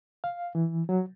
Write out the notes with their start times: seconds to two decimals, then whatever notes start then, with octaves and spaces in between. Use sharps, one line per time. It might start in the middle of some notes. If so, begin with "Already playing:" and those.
0.24 F5
0.55 E3
0.89 F#3